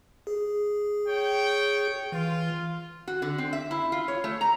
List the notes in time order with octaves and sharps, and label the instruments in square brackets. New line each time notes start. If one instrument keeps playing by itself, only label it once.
[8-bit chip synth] G#4
[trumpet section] C#5 G5
[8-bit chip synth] E3 [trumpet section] F4
[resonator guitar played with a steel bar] F#4
D3
C4
E5
E4
F4
C#5
A3
A#5